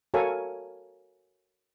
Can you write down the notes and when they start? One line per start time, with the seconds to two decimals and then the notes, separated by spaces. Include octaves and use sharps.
0.14 F#4 A4 A#4 C#5 F5 G#5